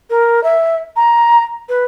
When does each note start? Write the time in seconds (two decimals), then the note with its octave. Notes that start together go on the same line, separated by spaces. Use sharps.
0.10 A#4
0.44 E5
0.96 A#5
1.69 B4